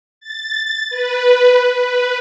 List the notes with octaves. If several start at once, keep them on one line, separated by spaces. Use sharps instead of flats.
A6
B4
B4